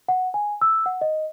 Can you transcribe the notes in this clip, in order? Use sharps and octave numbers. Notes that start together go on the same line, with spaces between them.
F#5
G#5
E6
F#5
D#5